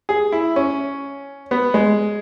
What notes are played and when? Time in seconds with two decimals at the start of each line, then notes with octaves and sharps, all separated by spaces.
0.09 G#4
0.32 E4
0.56 C#4
1.51 B3
1.74 G#3